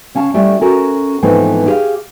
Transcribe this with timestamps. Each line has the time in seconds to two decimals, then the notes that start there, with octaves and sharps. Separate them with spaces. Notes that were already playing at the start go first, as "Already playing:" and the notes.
0.15 C#3 C#4 F5 A5
0.34 G3 A3 C#4 E4 D5
0.61 C#4 F#4 A4 A#4
1.22 G#2 E3 F3 A3 B3 C4
1.66 E4 G4 G#4 C5 C#5 F5